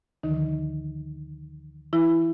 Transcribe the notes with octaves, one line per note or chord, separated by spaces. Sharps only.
D2 D3 D#3 F3 D#4
E3 E4